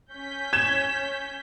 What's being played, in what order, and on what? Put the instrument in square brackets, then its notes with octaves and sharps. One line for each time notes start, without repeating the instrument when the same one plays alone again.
[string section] C#4 G6 B6
[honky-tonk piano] G#6 E7